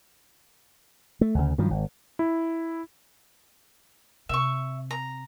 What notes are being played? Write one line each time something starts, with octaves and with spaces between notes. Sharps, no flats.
A3
D2 C#3
G2 D#3 F3 F#3
G#1
E4
C3 E5 C#6
A#5